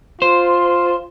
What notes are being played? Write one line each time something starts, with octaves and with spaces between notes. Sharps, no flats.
F4 C5